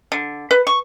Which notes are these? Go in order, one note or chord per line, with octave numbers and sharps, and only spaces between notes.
D3
B4
C#6